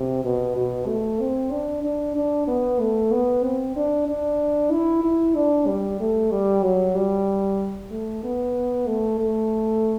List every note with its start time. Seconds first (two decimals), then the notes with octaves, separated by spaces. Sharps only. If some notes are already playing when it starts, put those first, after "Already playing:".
Already playing: C3
0.25 B2
0.56 B2
0.88 A3
1.21 C4
1.52 D4
1.83 D4
2.15 D4
2.47 B3
2.80 A3
3.12 B3
3.44 C4
3.76 D4
4.08 D4
4.71 E4
5.04 E4
5.35 D4
5.67 G3
6.00 A3
6.32 G3
6.63 F#3
6.96 G3
7.91 A3
8.24 B3
8.87 A3
9.19 A3